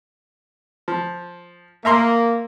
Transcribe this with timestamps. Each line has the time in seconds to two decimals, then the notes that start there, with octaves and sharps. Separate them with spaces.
0.88 F3
1.85 A#3 E5 A#5 C6